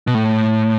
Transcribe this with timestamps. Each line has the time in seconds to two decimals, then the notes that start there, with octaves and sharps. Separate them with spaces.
0.07 B2
0.14 A2